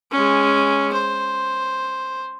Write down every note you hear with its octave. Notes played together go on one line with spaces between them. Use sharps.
G#3 C#4
C5